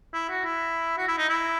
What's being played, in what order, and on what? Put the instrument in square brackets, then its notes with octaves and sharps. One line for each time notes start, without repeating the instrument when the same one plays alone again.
[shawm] E4
F#4
E4
F#4
E4
D#4
E4